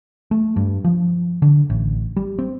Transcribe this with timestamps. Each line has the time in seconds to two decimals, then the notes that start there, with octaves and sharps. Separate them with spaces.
0.31 A3
0.56 G2
0.84 F3
1.42 D3
1.70 A1
2.16 G3
2.39 C4